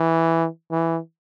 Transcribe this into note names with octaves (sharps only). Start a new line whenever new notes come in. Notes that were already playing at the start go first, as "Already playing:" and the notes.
Already playing: E3
E3